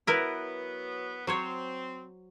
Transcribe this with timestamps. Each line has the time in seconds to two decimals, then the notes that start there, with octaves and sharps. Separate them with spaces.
0.07 F#3 B3 E4 A#4 B4
1.27 F#3 C4 C5 C#5